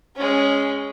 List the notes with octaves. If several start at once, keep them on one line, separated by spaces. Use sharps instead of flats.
G#3 C#4